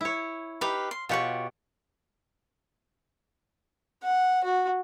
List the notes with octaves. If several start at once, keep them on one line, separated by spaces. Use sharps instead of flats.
E4 C#5
D#4 G4 B4 F5
C6
B2 F4 G4 C#5 F#5 C#6
F#5
F#4